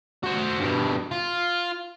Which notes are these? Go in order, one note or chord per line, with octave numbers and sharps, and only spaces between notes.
F#4 C5
G2 B2
F4